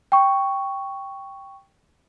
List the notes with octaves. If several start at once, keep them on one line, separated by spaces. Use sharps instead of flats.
G5 C#6